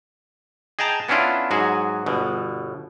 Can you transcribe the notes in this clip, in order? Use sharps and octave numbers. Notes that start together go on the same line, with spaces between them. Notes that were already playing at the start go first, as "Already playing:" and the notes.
G#4 D#5 G5 A5 A#5
B3 C#4 D4 E4 F4
G#2 F#3 F#4 G#4
G1 B2